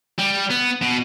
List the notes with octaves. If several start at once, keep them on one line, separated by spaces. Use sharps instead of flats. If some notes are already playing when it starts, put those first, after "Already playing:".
G3
B3
B2